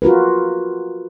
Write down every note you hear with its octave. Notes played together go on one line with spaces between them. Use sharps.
F4 F#4 A#4 B4